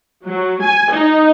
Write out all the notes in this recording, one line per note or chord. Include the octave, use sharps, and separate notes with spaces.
F#3
G#5
D#4